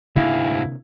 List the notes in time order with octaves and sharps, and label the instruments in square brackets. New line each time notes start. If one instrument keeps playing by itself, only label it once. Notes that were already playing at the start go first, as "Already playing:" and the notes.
[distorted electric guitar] D2 G#2 [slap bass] C3 A#3 D4 [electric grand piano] E4 F5